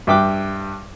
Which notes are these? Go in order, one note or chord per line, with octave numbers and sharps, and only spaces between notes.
G2 E5 G5 D6 F#6